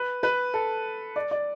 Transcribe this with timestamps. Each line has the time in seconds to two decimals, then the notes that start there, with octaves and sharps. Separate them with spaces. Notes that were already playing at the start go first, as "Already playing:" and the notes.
Already playing: B4
0.23 B4
0.54 A4
1.16 D5
1.31 D5